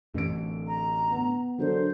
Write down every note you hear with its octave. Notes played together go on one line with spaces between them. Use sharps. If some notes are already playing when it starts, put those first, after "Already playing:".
A1 A2 D3 D7
A#5
B3
D3 F#3 A#4 C5